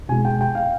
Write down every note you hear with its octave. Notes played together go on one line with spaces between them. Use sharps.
B2 G#3 G#5
G5
G5
F5